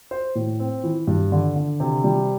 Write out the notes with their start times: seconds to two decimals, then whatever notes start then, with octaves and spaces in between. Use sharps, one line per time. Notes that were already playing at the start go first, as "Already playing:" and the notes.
0.11 C5
0.35 A2
0.60 C4
0.84 E3
1.07 G2
1.32 D3
1.56 D3
1.80 C3
2.04 G3